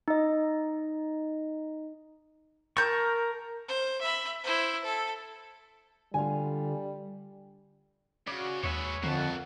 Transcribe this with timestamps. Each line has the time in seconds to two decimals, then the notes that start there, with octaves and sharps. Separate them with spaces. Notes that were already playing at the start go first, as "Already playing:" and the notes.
0.08 D#4 D#5
2.77 A#4 A5 C#6 G6
3.68 C5
4.01 E5 B5
4.44 E4 C5
4.84 A4
6.14 D3 G3 F4 G#5
8.28 C#3 F#4 D5
8.64 D#2 G#3 B4 C#5 E5 G#5
9.03 F2 D3 A#3 F#5 A5